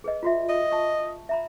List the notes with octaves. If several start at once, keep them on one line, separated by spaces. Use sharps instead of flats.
G#4 B4 D#5
F4 F#4 E5
D#5
A5 C#6
E5 A#5 B5